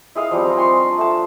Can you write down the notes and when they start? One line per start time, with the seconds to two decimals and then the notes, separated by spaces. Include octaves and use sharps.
0.15 E4 G#4 D#5 F5
0.31 F3 G3 C4
0.44 A#5
0.56 D#5 G#5 C6 C#6
0.84 D4
0.98 A3 A5